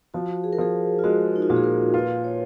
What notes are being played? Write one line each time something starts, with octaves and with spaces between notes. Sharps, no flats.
F3 F#4
G#4
A#4
F3 G#4
F4
G#3 F#4
D#4
F4
A#2 F#4
G#4
A#4
F4 B4
C#5